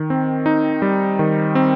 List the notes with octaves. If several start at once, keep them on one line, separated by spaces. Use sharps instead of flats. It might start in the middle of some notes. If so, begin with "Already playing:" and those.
Already playing: D#3
C4
D#4
G3
D#3
C4